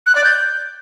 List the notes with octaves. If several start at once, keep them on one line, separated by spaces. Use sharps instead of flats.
F#6
D5
G6